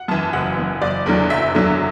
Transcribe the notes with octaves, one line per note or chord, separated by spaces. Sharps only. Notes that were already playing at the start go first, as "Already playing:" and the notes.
Already playing: F#5
F#2 E3 A5
F#1 F#5
F#2 E3
F#1 D5
E2 D3 F#3
F#1 E5
E2 D3 F#3